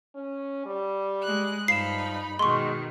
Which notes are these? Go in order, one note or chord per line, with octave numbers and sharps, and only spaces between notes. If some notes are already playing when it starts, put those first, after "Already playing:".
C#4
G3
G#3 F#6
G2 F3 D#4 B5 C7 E7
B2 D#3 G#3 C6 C#6